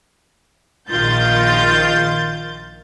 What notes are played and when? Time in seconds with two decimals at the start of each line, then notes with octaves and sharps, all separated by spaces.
0.90 A#1 D#3 F4 G6 A6